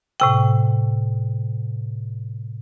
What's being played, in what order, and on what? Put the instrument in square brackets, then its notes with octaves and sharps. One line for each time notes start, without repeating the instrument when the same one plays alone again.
[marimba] A2 C3 G5